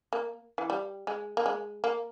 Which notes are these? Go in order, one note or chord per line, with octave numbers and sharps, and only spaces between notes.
A#3
E3
G3
G#3
A#3
G#3
A#3